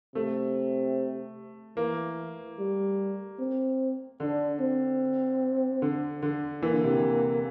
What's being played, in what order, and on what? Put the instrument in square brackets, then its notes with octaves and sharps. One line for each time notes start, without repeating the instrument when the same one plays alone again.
[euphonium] C3 [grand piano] A3
[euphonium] E3 [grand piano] A#3
[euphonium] G3
C4
[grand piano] D3 [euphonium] D4
[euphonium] C4
[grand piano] D3
D3
[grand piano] E3 [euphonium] A#3
[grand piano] D3
C3
D3